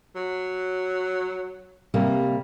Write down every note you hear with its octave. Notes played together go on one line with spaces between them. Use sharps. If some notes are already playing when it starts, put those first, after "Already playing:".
F#3
C3 G3 A#3